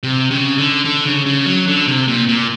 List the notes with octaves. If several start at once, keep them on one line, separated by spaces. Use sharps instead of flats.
C3
C#3
D3
D3
C#3
C#3
F#3
D3
C3
A#2
A#2